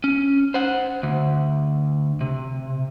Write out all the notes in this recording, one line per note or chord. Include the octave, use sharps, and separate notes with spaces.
C#4
C5 F#5
D2
C3